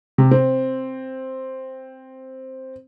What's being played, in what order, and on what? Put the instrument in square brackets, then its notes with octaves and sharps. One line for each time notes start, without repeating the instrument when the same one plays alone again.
[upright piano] C3
C4